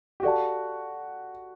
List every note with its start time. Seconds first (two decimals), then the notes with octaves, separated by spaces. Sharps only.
0.20 G4
0.23 F#4 A4 D5 F5 A5